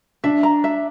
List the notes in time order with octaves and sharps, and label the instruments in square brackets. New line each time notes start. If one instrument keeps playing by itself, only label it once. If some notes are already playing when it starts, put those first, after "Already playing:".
[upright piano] D4 [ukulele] E5
[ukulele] A#5
E5